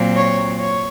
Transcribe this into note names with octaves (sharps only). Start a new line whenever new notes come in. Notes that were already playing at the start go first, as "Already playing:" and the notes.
Already playing: A#2 F#3 C4
C#5
C#5